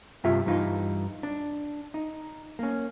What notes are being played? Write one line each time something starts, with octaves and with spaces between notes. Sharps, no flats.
G2 C3 F4 E5
G2 E3 D#4 F4
D4
D#4
A#3 C#4